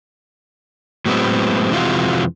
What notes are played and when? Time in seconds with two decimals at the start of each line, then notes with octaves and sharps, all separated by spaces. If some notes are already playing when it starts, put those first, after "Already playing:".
1.06 A2 F#3 G#3 B3 C4
1.71 F2 C3 E3 G#3 F4 F#4